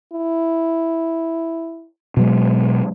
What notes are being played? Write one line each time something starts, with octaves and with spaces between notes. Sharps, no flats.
E4
B2 F#3 G#3